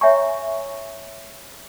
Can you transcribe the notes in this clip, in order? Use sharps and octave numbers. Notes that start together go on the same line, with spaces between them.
C#5 E5 G5 G#5 A#5 C#6